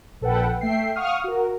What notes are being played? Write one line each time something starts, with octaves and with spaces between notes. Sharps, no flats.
A#1 A4 B4 F#5 G5
A3 E5 G5 C7
F5 F#5 C#6 D#6 F6
F#4 A#4